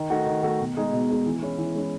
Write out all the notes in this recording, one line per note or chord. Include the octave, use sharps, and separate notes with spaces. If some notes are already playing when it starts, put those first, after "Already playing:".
Already playing: D#3
A3 D#4 F#4
D#3
A3 D#4 F#4
B2
G#3 D#4 G#4
B2
G#3 D#4 G#4
E3
G#3 C#4 E4
E3
G#3 C#4 E4